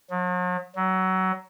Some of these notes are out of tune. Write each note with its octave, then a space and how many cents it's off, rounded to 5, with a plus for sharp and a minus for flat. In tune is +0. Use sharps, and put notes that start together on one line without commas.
F#3 -45
F#3 +20